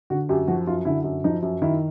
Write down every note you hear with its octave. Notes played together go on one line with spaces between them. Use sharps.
D3 F#4
F#2 G4
F3 F#4
F#2 F4
D3 E4
F#2
F3 D#4
F#2
D#3 E4